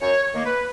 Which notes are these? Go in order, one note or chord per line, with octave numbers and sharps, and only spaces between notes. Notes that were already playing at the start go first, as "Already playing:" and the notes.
F#2 C#5
C#5
D#3 A#3
B4